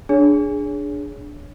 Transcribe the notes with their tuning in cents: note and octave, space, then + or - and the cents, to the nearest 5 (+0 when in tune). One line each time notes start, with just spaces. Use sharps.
D4 +0 G#4 +0 C#5 +15